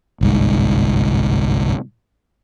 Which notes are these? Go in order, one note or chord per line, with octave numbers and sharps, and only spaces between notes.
G1 C2 G#2